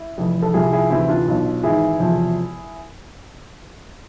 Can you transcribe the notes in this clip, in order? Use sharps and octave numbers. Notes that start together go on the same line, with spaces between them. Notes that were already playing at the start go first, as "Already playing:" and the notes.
Already playing: E4
F1 F2 E3
A4
C2 C3 F3 E4 G#4
E4 G#4
D2 C3 E3 C4 E4
D4 F4
B1 B2
G#1 G#2 E3 E4 G#4
E1 E2 C3 F3